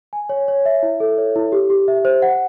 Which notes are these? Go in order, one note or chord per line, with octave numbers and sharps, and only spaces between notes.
G#5
C#5
C#5
E5
E4
A4
C#5
E4
G4
G4
E5
C5
F#5